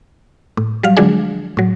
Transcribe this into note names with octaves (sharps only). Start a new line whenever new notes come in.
A2
F#3 G3 F5
D3 F3 F#3 G#3 D4 G#4
A2 F#3